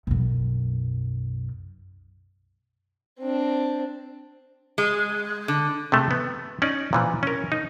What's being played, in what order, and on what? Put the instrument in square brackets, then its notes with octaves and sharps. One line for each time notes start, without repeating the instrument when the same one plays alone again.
[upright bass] B1 F#2
[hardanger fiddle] C4 D4
[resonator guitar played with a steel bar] G#3
D3
[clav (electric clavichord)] C3 G#3 A3
B3
C#4 D#4 D5
A#2 E3 F3
C#4 A#4
D#4